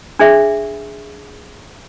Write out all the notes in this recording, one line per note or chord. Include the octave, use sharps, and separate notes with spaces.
D4 G#4 E5